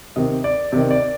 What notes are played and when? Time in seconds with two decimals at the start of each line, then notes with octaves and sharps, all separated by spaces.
0.16 C3 D#3 D#5
0.44 D5
0.72 C3 D#3 D5
0.91 D5